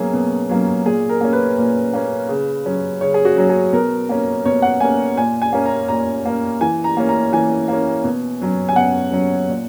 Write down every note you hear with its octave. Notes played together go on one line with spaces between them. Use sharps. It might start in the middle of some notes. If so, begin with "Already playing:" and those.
Already playing: B2 F#3 A#3 C#4 G#4
B2
F#3 A#3 C#4
A#2 G#4
A#4
A#3 C#4
B4
A#2
A#3 C#4
C#3
F#3 C#4
C#3 C#5
G#4
F#4
F#3 C#4
G#4
B2 A#4
A#3 C#4
B2 C#5
F#5
A#3 C#4 G#5
A#2 G#5
G#5
A#3 C#4
A#5
A#2 A#5
A#3 C#4
E3 G#5
A#5
A#3 C#4
A#5
E3 G#5
A#3 C#4
B2
F#3 C#4
G#5
B2 F#5
F#3 C#4
A#2